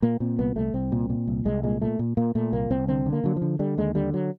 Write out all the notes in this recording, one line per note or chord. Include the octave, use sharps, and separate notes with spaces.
A#2 A#3
A#2 C4
C2 B3
C2 A3
C2 C4
A#2
A#2
C2
C2 G#3
A#2 G#3
A#2 A3
A#2
A#2 A#3
A#2 A3
C2 A#3
C2 C4
D3 C4
D3
A#3
D3 F#3
F3
D3
D3 G3
D#2 G#3
D3 G3
F#3